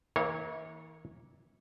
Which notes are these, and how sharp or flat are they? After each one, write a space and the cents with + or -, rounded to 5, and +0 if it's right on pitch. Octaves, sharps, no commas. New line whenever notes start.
E3 -45 A#3 +0 C#5 -20